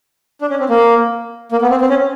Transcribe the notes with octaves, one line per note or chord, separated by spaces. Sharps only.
D4
C#4
C4
A#3
A#3
B3
C4
C4
C#4